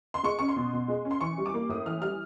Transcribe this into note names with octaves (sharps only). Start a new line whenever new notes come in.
C6
G#3 C#6
C#4 C#6
C6
B2
B2
G#3
C#4
C6
E3 C#6
G3
D6
A#3
A2 D#6
E3 F6
G3 F6